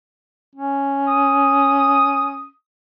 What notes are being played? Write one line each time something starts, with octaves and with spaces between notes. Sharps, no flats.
C#4
D#6